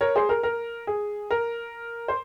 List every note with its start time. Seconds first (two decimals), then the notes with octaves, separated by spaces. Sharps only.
0.01 A#4 C#5
0.16 G#4 C5
0.29 A#4
0.43 A#4
0.87 G#4
1.31 A#4
2.08 C5